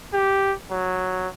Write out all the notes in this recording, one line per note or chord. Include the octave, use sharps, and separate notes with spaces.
G4
F#3